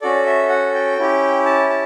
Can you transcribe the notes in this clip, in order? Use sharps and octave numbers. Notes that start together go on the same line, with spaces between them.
C#4 F#4 A4 D5
E5
F#5
G5
C#4 E4 G4
A5
A5